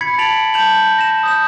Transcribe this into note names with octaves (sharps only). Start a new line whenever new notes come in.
B5 G#6 B6 C#7
A5 A6 D7 F7 F#7
A5 G6 F7 F#7
A#6 E7
D#6 G6 E7